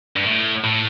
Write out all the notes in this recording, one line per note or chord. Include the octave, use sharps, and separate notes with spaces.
G2
A2
A2